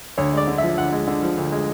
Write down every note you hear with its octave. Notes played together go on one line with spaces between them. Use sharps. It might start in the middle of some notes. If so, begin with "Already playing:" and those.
D2 C#5
G#3 D5
D3
F3 E5
D2 F#5
G#3
D3
F3
D2
G#3